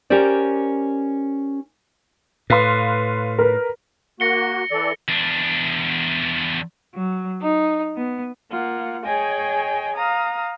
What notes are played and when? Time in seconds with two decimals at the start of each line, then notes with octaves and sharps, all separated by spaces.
0.10 C#4 G4 A#4 C5 D5
2.50 A2 B4 F5 C6
3.39 A#4 B4
4.20 A#3 F#4 A#6 C#7 G7
4.71 E3 A4 D5
5.08 E2 D4
6.94 F#3
7.42 D#4
7.97 B3
8.51 A#3 F4 F#5
9.04 G#4 C#5 D#5 G5 G#5
9.95 F5 A#5 D#6